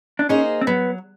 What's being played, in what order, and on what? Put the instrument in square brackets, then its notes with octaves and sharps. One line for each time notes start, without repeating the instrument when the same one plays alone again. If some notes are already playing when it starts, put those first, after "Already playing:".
[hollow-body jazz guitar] D4
[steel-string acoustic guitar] A#3 D#4 G#4 C5 [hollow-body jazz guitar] C#4
[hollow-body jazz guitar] C4
[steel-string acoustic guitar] F#3 [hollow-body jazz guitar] B3